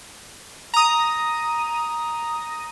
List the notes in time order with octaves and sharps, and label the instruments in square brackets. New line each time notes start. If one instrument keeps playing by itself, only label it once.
[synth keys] A#5 D#6